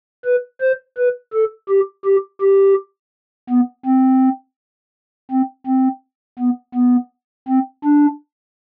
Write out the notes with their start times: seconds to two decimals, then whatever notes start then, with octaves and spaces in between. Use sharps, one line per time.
0.24 B4
0.61 C5
0.97 B4
1.33 A4
1.69 G4
2.06 G4
2.42 G4
3.50 B3
3.85 C4
5.31 C4
5.66 C4
6.39 B3
6.75 B3
7.48 C4
7.84 D4